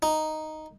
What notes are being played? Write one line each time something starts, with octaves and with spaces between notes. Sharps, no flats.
D#4